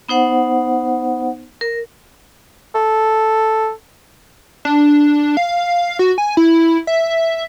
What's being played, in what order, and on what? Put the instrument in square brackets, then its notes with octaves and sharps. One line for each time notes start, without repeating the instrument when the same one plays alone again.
[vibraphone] B3 D#4 C5 F#5
A#4
[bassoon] A4
[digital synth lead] D4
F5
F#4
G#5
E4
E5